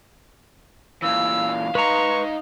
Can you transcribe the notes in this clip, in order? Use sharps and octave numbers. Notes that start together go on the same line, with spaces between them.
A#2 E3 F5 E6
D#4 B4 C5 A#5 C#6